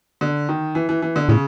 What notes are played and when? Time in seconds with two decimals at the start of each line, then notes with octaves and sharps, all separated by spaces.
0.21 D3
0.49 D#3
0.75 E3
0.89 E3
1.02 E3
1.16 D3
1.29 A2 C#3